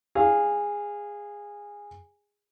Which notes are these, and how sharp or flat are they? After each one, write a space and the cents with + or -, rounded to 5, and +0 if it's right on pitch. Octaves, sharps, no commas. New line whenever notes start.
G#4 -15 F5 +0